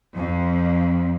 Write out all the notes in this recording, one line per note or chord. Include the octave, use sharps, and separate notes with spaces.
F2